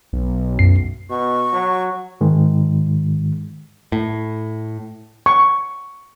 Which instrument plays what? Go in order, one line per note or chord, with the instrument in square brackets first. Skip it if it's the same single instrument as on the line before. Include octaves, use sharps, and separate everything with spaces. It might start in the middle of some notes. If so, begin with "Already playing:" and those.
[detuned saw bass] B1
[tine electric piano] F#2 C7
[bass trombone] B2 [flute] C#6
[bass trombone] F#3
[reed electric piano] G#2 D#3 G#3
[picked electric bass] A2
[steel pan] C#6